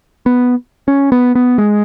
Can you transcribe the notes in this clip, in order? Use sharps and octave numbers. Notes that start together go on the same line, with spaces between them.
B3
C#4
B3
B3
G#3